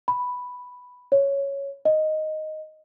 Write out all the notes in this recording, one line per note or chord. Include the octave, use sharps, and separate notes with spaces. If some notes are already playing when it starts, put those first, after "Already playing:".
B5
C#5
D#5